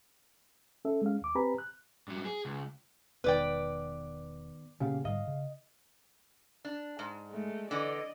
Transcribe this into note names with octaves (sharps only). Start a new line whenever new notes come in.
C#4 A4 E5
G#3 C#4 F5
D#2 D6
C4 G4 B4 G#5 A#5 B5
F#6
G2 F#3
G#4
C#2
E1 D#3 B3 B4 D5 G5
A#2 C#3 A#3 B3 C#4 G4 F5
G#2 D3 G3 D#5 F5
C#3
D4
G#2
G#3 A3
D3 E3 D5 D#5